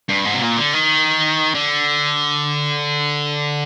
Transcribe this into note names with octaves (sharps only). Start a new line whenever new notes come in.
G2
G#2
C3
A#2
D3
D#3
D3